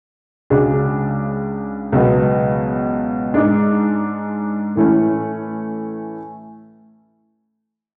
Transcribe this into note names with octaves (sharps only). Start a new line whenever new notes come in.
C#2 C#3 G#3 D4 F#4
C#2 B2 F#3 B3
G#2 G#3 D4
A2 E3 A3 C#4